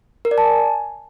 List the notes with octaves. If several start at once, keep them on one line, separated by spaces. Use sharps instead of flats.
A#4
D5
A5
G#5